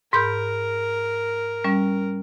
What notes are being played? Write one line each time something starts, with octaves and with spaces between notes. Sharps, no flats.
G#2 A#4 B5 G6
G3 C#4